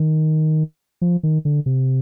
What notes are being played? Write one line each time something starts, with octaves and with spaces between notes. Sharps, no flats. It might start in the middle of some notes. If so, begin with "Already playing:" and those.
Already playing: D#3
F3
D#3
D3
C3